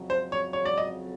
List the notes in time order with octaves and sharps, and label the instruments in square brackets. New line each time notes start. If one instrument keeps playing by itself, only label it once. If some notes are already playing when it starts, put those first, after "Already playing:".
Already playing: [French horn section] F2 C#3 F#3
[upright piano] C5
C#5
C#5
D5
D#5